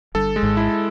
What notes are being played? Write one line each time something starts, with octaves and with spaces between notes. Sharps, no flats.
G1 G2 A4
G#3
G#1 G#2
E4